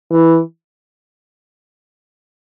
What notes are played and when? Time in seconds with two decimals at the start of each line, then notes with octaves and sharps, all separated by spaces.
0.11 E3